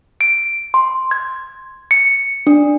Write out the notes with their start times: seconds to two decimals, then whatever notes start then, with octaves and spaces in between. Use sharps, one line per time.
0.21 D7
0.74 C6
1.11 G#6
1.91 C#7
2.47 D4